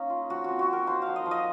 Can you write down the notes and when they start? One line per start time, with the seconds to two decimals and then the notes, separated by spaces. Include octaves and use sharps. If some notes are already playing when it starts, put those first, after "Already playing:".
Already playing: A#3 C#4 D#4
0.10 F4
0.29 F3 F#4
0.44 C4 F#4
0.59 F#4
0.68 C4 A#4
0.87 D#4 C5
1.02 F3 F5
1.16 D#5
1.26 F3
1.31 D#5